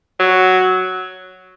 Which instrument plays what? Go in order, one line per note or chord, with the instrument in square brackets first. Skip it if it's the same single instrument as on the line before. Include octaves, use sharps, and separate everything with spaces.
[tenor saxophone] F#3